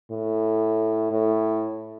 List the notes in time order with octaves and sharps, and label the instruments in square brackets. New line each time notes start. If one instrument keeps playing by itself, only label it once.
[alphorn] A2
A2